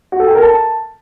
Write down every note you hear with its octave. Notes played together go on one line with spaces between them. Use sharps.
F#4
A4
G5
A#4
A5